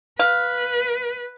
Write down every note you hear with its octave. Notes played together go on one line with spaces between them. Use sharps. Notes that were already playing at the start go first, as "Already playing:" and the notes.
B4 F5